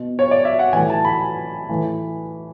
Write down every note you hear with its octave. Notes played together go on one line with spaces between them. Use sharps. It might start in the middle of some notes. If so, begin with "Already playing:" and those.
Already playing: B2
C#5
D5
E5
F#5
A2 E3 G#5
A5
B5
A2 E3